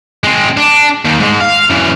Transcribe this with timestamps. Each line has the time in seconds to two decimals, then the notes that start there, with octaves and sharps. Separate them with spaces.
0.24 G#3 C4
0.57 D4
1.05 D#2 D#3
1.20 G#2 G#3
1.40 F5
1.70 F#2 E3